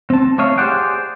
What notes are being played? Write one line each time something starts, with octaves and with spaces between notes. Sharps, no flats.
C4 A5
A3 A4 C#5 D#5 F5
G4 G#4 C5 D5 F#5 G5